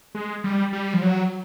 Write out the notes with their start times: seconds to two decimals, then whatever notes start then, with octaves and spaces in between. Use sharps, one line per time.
0.15 G#3
0.44 G3
0.73 G3
0.94 F3
1.02 F#3